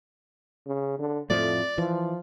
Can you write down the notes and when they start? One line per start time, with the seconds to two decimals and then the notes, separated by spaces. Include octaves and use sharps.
0.66 C#3
0.99 D3
1.30 F2 A2 F3 A3 D5
1.78 E3 F3